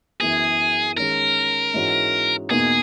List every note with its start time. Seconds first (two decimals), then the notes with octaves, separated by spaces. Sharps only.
0.21 F#2 E3 B3 G#4
0.97 D#3 G#3 C#4 G#4 A#4
1.74 G#2 E3 G#3 C#4 F#4
2.50 E2 B2 A#3 D#4 G#4